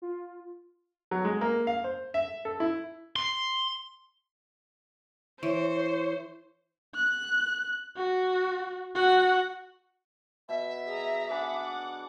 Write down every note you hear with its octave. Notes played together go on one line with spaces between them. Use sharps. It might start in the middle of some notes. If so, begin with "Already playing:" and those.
F4
F#3
G#3
A#3
F5
C5
E5
A4
E4
C6
E3 C5 C#5
F#6
F#4
F#4 F#5
B2 E5
G#4 A#5
D4 G#4 F#5 B5 D6